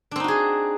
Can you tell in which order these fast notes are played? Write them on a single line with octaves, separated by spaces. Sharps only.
D4 C4 D#4 F#4 G#4